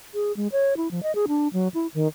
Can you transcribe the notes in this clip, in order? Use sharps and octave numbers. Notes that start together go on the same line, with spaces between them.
G#4
G#3
C#5
E4
F3
D#5
G#4
D4
F#3
E4
D#3